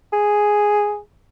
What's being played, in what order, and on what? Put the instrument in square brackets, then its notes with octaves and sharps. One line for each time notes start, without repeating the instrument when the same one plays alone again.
[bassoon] G#4